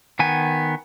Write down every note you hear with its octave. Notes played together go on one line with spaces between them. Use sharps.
D#3 B3 G#5